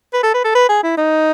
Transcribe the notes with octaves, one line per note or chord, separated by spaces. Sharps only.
B4
A4
B4
A4
B4
G#4
E4
D#4